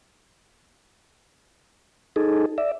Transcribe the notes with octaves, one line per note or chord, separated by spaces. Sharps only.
D#4 G#4 A4
D5 E5